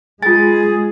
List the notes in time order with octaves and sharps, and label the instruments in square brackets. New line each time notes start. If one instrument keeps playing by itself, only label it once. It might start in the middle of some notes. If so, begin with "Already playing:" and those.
[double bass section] G#3 [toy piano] F4 G#5 [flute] G#4 [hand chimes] A6